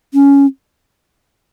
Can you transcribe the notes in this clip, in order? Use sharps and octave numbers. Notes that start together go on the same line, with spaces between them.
C#4